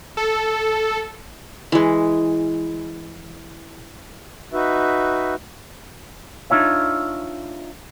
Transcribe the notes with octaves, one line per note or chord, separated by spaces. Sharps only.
A4
E3 G#3
D#4 F#4 B4 E5
D4 D#4 F4 C#5 E5